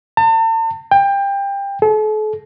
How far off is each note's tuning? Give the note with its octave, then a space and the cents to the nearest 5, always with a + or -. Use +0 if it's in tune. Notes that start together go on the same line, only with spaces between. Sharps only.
A5 +40
G5 +25
A4 -40